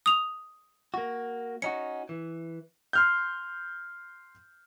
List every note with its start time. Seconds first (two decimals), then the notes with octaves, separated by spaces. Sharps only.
0.06 D#6 F7
0.94 A#3 F#4
1.62 C#4 D#4 F#4 C#7
2.09 E3
2.93 C6 F6 G6